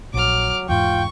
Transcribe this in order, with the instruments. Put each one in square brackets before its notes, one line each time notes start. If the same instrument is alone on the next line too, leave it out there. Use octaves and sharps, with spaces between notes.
[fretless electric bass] A#1 [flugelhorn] F#3 [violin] D6 F6
[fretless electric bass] E2 G#2 [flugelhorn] F4 [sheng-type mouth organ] G5 [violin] C#6